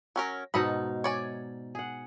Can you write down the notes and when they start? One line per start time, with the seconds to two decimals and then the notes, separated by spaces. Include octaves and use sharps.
0.16 F#3 C#4 A#4
0.54 G#2 B2 D#4 A4 D#5 B5
1.04 C#5 D5 G#5
1.75 G#4 F#5